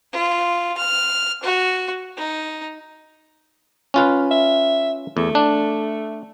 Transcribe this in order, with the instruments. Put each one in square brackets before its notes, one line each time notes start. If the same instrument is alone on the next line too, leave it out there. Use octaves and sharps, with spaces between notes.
[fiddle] F4
F6
F#4
D#4
[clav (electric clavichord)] C#4 F4 B4
[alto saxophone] E5
[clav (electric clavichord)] E2 [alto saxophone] A3
[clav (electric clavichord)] D4